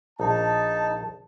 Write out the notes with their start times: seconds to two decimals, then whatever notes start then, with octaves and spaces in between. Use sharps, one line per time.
0.20 A#1 D#4 A5